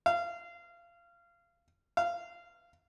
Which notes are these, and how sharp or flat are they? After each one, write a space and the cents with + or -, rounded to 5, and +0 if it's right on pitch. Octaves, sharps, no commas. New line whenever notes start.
F5 -25
F5 -20